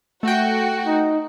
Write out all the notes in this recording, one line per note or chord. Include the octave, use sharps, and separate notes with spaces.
A3 F#4 G5
D#4